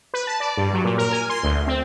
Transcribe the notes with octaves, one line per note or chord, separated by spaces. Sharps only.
B4
A5
D5
G2
F#3
A#2
A#4
G#5
C6
D2
C4